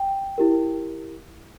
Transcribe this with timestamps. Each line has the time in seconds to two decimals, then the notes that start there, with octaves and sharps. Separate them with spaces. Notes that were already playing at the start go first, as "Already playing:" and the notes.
Already playing: G5
0.38 E4 G4 A#4